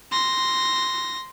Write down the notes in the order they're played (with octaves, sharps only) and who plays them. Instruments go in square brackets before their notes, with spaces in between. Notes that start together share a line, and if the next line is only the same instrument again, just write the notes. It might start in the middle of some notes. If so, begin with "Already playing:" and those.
[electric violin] C6 A#6